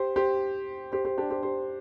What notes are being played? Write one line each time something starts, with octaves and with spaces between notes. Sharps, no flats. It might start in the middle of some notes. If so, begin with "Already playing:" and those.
Already playing: G4 C5
G4 C5
G4 C5
G4 C5
D4 G4
G4 C5
G4 C5